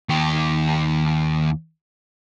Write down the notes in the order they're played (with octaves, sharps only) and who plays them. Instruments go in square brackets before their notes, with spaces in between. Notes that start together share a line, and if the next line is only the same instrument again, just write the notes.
[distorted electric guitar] D#2 G4